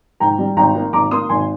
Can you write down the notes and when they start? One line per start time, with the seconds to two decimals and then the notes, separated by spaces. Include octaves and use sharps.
0.20 G#2 G5 A#5
0.39 G3
0.57 G#1 G5 A#5
0.75 A#3
0.93 G#1 A#5 D6
1.11 A#3 C6 D#6
1.29 G#1 G#5 C6